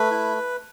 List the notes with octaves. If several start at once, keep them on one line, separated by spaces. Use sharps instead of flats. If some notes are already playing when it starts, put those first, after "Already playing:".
Already playing: A3 B4
E4